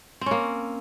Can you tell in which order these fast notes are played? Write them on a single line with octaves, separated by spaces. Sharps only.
C4 C#4 A#3